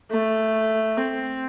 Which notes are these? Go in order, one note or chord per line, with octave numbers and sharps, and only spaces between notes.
A3
C4